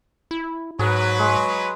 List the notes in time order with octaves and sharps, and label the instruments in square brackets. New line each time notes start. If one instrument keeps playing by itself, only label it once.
[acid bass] E4
[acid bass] G#2 [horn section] F#3 B4 [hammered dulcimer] G#4
[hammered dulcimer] G#3 G#4